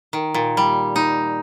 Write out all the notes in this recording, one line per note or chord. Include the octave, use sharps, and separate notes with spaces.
D#3
A#2
G3
D#4